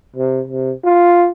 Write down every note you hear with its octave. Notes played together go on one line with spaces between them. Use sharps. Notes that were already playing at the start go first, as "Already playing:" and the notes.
C3
C3
F4